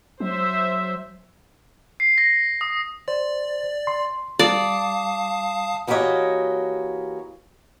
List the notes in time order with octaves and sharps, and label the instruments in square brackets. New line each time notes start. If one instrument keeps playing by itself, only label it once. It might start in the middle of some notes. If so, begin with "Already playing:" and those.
[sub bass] F#3 [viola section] C5 E5
[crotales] C7
A#6
D#6
[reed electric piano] C5 [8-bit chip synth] D5
[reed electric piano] C6
[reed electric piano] G3 [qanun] D5 [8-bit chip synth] F5 A5 D#6
[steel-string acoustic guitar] E3 A#3 F#4 G4 C#5 D#5